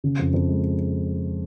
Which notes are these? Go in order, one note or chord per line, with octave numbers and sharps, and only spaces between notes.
C#3
F2
F2
G#3